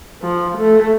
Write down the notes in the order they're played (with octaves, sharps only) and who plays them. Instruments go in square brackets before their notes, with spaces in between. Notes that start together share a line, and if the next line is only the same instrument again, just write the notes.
[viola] F3
A3